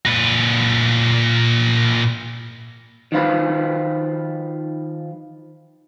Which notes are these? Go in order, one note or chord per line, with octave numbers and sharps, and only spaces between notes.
A#2 B4
D#3 F3 F4 B4